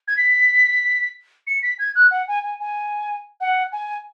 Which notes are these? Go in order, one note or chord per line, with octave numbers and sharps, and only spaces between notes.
G#6
B6
C#7
B6
G#6
F#6
F#5
G#5
G#5
G#5
F#5
G#5